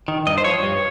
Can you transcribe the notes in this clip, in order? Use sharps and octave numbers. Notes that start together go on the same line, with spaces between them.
D#3
G2 D#5
C5
F3 C#5
G2